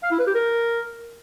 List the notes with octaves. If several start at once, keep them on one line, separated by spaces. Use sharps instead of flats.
F5
E4
B4
G4
A#4